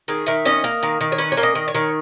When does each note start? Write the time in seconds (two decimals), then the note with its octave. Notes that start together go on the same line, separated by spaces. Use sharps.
0.08 D#3 G#4
0.26 D#3 E5
0.45 C#4 D#5
0.64 A#3
0.83 D#3
1.01 D#3
1.12 C#5
1.18 C#4 B4
1.32 C#5
1.37 A#3
1.43 D#5
1.55 D#3
1.68 C#5
1.75 D#3